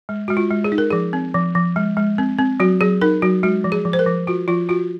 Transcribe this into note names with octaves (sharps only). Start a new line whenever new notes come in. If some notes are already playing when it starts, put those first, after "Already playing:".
G#3
G#3 F#4
F4
G#3
G#4
D#4
A#4
F3 G#4
C4
F3
F3
G#3
G#3
C4
C4
F#3 F#4
F#3 G#4
D#4 A#4
F#3 F#4
G#3 F#4
F3
G#4
F3
C5
A#4
F3
F4 F#4
F3 F4
F4 F#4